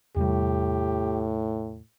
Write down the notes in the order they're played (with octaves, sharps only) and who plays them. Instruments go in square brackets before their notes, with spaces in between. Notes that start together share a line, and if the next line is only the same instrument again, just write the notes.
[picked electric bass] E2 C3 G3 [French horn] A2 [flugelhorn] G4